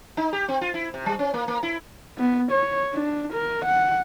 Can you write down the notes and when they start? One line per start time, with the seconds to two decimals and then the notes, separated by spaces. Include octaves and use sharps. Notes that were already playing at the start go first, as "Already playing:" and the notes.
0.17 D#4
0.33 G4
0.48 C4
0.61 F4
0.74 E4
0.94 C3
1.06 G3
1.19 C#4
1.34 A#3
1.48 A#3
1.63 E4
2.18 B3
2.51 C#5
2.93 D4
3.33 A#4
3.65 F#5